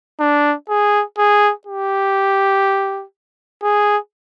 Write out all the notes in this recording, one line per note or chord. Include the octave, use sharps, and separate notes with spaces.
D4
G#4
G#4
G4
G#4